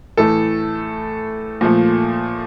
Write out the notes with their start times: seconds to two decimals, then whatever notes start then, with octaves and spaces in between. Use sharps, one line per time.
0.17 A2 E3 A3 A4
1.61 A#2 F3 A3